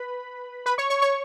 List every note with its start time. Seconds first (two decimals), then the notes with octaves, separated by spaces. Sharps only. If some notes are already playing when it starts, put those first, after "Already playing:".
Already playing: B4 B5
0.66 B4 B5
0.78 C#5 C#6
0.90 C#5 C#6
1.02 C#5 C#6